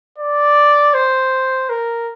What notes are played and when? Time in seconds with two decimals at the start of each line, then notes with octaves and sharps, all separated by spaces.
0.18 D5
0.94 C5
1.70 A#4